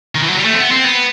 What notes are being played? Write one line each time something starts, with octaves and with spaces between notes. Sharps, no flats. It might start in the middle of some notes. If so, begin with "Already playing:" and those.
D#3
E3
F#3
G3
A3
C4
B3
C4
B3